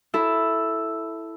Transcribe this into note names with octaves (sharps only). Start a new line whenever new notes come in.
E4 A4